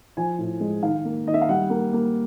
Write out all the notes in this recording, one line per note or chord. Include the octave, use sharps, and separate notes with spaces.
F3 G#5
A2
G#3
D#3 F5
A#3
D#3 D#5
E5
F5
G3 F#5
A#3
A#3